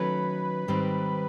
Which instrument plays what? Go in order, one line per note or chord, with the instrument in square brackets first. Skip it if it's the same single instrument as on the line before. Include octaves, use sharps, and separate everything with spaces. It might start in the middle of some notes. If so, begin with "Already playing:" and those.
Already playing: [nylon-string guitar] D#3 F#3 A3 C#4 [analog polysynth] B4
[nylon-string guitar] G#2 D#3 G3 C4